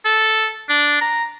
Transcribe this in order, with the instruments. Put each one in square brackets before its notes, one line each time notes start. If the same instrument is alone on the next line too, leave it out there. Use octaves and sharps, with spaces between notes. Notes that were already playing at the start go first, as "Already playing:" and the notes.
[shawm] A4
D4
A#5